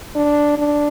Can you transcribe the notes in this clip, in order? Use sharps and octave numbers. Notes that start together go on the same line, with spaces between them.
D4
D4